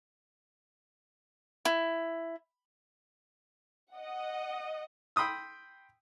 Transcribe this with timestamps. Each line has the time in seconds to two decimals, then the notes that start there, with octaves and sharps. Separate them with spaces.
1.65 E4
3.92 D#5 F#5
5.16 G5 B5 C6 D#6 E6